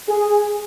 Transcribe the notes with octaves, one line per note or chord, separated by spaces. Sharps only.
G#4